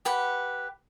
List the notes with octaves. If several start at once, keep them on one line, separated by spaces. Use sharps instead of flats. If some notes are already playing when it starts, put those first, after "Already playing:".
G4 B4 F#5